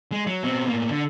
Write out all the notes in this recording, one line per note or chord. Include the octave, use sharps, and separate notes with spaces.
G#3
F#3
B2 C4
A2 A#3
D3